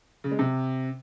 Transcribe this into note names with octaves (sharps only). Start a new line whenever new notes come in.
C#3
G#3
C3